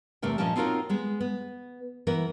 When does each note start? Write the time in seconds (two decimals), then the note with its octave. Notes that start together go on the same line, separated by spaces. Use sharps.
0.22 E2 C3 A3 A#4 G5
0.38 A#2 F3 C#4 D#5 G5 A5
0.56 C4 D#4 F4 F#4 A#4 C#5
0.89 G#3 B3
1.21 B3
2.07 E3 B3 A#4